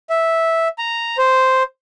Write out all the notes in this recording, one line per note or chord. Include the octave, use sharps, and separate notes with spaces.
E5
A#5
C5